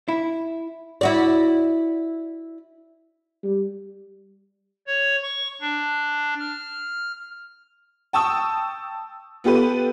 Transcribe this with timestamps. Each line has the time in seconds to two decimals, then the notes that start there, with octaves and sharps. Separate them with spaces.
0.08 E4
1.01 E4 F#4 D5
3.43 G3
4.87 C#5
5.23 C#6
5.61 D4
6.39 F6
8.13 G5 A5 C#6 D#6 E6
9.44 B3 F4 G4 A4 B4